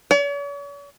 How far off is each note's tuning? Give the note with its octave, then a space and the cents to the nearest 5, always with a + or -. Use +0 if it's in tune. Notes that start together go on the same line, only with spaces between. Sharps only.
C#5 +45